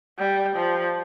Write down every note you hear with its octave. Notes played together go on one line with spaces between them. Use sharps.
G3
F3